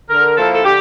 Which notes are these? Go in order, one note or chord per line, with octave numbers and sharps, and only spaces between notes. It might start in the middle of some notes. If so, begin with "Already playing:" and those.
D3 A#4
F3 A#3 E4 A4
A4
D3 G4